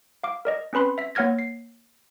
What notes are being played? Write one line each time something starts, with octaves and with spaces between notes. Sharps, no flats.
F5 D6
A#4 D5 D#5
C4 C#4 B4 B5 C6
E5 B6
A#3 C#5 F#5 F6 G#6 A#6
C7